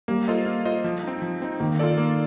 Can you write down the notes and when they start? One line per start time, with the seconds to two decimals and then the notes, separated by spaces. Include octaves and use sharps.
0.08 G3 A#3
0.28 F4 A4 C5 D#5
0.46 A#3
0.65 F4 A4 C5 D#5
0.84 F3
1.04 C4 D#4
1.22 F3
1.42 C4 D#4
1.60 D#3 A#3
1.79 F4 A4 D5
1.98 A#3